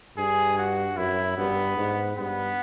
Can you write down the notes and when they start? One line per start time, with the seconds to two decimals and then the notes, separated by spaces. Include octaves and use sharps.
0.17 G2 G#4
0.58 F#4
0.97 F#2 E4
1.37 G2 B3
1.77 G#2
2.17 G2 B3